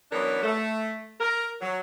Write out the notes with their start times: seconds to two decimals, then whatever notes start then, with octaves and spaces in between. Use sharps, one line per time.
0.12 E3 F#3 B3 C#4 D4 A#4
0.43 A3
1.21 A#4
1.61 F#3